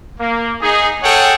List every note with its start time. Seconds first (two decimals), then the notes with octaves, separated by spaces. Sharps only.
0.21 A#3
0.62 D#4 G#4
1.03 G#4 A4 C#5 F#5 G5